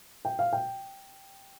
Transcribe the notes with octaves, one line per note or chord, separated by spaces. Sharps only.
G5
F5
G5